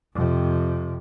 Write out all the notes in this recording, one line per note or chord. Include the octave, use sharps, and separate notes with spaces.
F2 C3